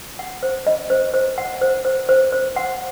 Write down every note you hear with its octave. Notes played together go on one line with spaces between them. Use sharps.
F#5
C5
D#5
C5
C5
F#5
C5
C5
C5
C5
F#5